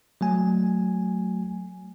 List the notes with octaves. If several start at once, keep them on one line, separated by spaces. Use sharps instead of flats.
F#3 A3 G#5